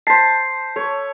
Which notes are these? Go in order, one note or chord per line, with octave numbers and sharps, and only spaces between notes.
C5 A5 B6 C7
A4 C#5